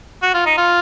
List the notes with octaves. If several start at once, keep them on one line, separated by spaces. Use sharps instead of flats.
F#4
F4
D#4
F4